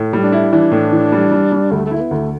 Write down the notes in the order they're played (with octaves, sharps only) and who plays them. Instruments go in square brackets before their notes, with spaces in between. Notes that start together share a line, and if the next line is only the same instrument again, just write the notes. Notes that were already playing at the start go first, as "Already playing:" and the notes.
Already playing: [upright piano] A2
G3
[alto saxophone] D4
[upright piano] E4
[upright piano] E3 [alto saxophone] D4
[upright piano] A2
E3
G3
G3
G3
[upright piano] D2 [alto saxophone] A3
[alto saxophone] A3
[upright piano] E4
[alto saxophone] A3
B3
[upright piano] D2 [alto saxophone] A3